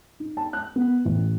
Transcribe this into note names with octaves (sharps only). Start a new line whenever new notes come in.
D#4
A5
F#6
B3
A1